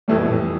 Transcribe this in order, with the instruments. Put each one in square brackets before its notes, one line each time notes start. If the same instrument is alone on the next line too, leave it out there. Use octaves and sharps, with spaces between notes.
[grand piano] F2 E3 G3 [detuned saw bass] A3
[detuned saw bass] B2
A2